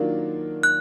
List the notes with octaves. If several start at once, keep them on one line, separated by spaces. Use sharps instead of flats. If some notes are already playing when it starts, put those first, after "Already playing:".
Already playing: D#3 F#3 A#3 D4 F4
F#6